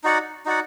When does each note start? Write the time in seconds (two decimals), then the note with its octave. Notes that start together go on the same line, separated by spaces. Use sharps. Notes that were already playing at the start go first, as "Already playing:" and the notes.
0.04 D#4 F#4 D5 F#5
0.45 D#4 F#4 D5 F#5